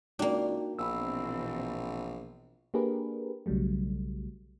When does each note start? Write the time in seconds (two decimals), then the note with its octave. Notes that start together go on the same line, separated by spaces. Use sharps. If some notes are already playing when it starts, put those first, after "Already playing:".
0.19 C#2 A#3 D4 D#4 F#4 G5
0.79 A#1 B2 E3 C4 B5 E6
2.74 A#3 D4 G4 G#4 A#4 B4
3.46 B1 C#3 F#3 G3 A3